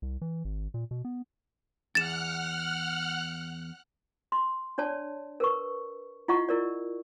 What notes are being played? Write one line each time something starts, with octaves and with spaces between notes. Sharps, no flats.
C2
E3
G#1
A#2
B2
B3
E2 F#5 F6 F#6 A6 E7
C6
D4 C#5 D5 A5
A#4 B4 C#6
E4 F4 D#5 F#5 C#6
E4 A#4 D5